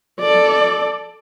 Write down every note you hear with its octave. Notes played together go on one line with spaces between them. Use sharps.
A4 D5